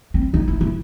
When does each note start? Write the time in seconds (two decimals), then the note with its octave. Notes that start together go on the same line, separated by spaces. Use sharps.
0.14 C4
0.34 D#4
0.48 E4
0.61 E4